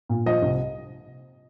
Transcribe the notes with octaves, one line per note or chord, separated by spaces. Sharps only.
A#2
F3 D#5
C2